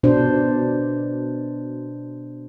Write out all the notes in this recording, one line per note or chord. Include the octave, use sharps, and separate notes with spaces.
B2 D4 C5